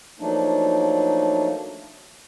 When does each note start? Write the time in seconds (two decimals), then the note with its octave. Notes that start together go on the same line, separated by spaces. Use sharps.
0.20 F3 F#3 A3 A#3 D4 D#4